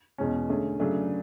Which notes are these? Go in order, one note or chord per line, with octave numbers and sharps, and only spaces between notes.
E2 B2 G#3 C#4
D3 A3 C#4 G#4
C#3 F#3 A3 D4 G#4